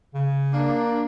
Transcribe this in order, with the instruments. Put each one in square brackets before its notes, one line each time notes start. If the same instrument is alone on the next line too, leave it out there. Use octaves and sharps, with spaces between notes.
[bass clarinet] C#3
[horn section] A#3 D4